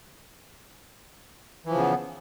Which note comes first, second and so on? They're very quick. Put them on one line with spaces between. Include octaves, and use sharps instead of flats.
E3 F3 C#3 B3